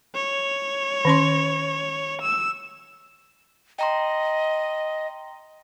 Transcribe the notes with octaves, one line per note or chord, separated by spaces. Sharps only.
C#5
D#3 C#4 C6
E6
D#5 G5 A#5 C6